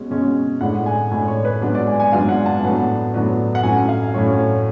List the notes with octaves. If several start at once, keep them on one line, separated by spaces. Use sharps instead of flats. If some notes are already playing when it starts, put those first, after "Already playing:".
Already playing: B2 G#3 C#4
B2 G#3 C#4
A2 G#3 D4 F#5
G#5
A2 G#3 D4 G#5
C#5
B4
G#2 F#3 B3 D4
D5
G#5
G#5
G#2 F#3 B3 D4 F5
F#5
A5
A2 F#3 B3 D4
A2 F#3 B3 D4
F#5
A2 F#3 C#4 G#5
F5
A2 F#3 C#4 C#5
C#5